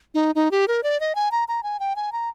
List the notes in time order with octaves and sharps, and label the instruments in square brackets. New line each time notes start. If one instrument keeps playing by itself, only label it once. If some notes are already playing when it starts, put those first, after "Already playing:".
[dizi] D#4
D#4
G4
A#4
D5
D#5
G#5
A#5
A#5
G#5
G5
G#5
A#5